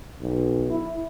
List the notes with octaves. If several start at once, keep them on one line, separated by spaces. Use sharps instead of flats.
B1
E4